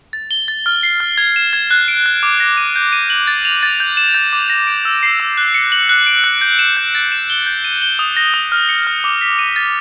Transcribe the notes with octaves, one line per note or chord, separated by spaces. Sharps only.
A6
G7
A6
F6
C7
F6
G#6
E7
G#6
F#6
D7
F#6
D6
A#6
D#7
G6
D#7
F#7
A6
F7
A6
G6
E7
G6
D6
A#6
D7
E6
C7
E6
F#6
C#7
F#7
F#6
D7
F#6
G6
E7
G6
A6
E7
G7
G6
D#7
G7
D#6
A#6
D#6
F6
C#7
F6
D6
B6
D#7
A6